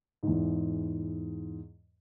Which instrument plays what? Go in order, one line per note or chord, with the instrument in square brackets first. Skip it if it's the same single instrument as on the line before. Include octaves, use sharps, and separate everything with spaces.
[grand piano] E2 G#2